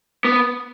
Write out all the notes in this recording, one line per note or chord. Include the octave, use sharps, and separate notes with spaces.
B3